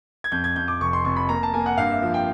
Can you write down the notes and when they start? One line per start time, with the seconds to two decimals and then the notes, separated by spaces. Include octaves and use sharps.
0.24 G#6
0.32 F2 G6
0.44 G#6
0.56 F2 G6
0.68 D6
0.80 F1 C#6
0.93 C6
1.05 F1 C#6
1.16 B5
1.29 A#3 A#5
1.43 A5
1.54 A#3 G#5
1.66 F#5
1.77 G2 F5
1.90 E5
2.02 F3
2.14 G5